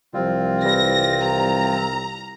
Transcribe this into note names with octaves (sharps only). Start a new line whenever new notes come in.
C2 F3 G3 C4 F4
E3 G3 A#6
A#5